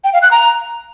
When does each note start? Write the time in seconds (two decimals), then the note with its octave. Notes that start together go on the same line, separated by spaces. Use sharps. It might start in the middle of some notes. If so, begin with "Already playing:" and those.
0.04 G5
0.13 F5
0.22 F#6
0.31 A#5